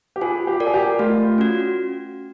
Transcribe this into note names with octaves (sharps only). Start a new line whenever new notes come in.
G4
F4 G#4
G4
A#4 D5
G#4
G4
A3 F4
C#4 F#4